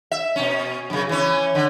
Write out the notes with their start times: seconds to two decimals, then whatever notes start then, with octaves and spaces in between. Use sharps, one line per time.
0.11 E5
0.36 B2 C#4
0.90 F#2 C#3
1.09 E3 C#4
1.55 D3